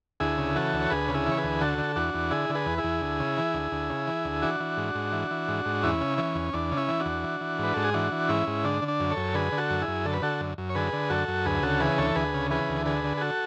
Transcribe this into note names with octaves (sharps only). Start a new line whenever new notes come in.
D2 E4 G#4
C#3
E3 F#4 A4
D2
C#5
D2 G#4 B4
C#3
E4 G#4
E3
C#5
G#4 B4
D2
D3 F#4 A4
D3
E2 D4 F#4
E2
D3 E4 G#4
D3
G#4 B4
E2
E4 G#4
E2
D2
C#3
E3
D2
D2
C#3
E3
D2
E3 D4 F#4
E3
G#2
G#2
E3
E3
G#2
G#2
E2 C#4 E4
C#3
E3 C#4
E2
E2 D4
C#3
C#4 E4
E3
D4 F#4
E2
E3
E3
G#2 B4
G#2 A4
G#4
E3 D4 F#4
E3
G#2 C#4 E4
G#2
D3 D4
D3
D4
F#2
A4 C#5
F#2
D3 G#4 B4
D3
F#4 A4
F#2
E4 G#4
F#2
D3 A4
B4
D3 F#4 A4
F#2
F#2
C#5
D3 G#4 B4
D3
F#2 F#4 A4
F#2
D2 G#4 B4
C#3 F#4 A4
E3 G#4 B4
D2 A4 C#5
D2 G#4 B4
C#3
E3 G#4 B4
D2
D3 G#4 B4
D3
G#4
F#4 A4